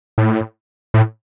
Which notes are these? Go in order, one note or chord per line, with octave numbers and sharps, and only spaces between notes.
A2
A2